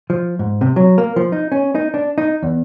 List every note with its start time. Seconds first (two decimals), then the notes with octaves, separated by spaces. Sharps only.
0.10 F3
0.39 G#2
0.61 C3
0.76 F#3
0.98 A#3
1.16 F3
1.32 D#4
1.52 C#4
1.75 D#4
1.94 D4
2.18 D#4
2.43 E2